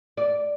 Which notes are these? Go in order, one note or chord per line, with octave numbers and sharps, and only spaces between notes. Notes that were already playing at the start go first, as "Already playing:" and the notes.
D5